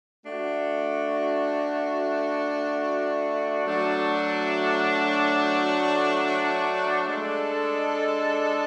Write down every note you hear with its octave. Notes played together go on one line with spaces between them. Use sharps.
A3 D4 F#4
F#3 A3 D4 F#4
G#3 D4 A4